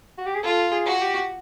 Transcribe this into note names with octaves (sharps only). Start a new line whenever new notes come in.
F#4
G4
G#4
F4 A4
G#4
F#4
G4